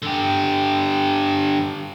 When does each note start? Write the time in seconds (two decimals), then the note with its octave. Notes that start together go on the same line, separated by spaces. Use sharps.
0.02 D3 G4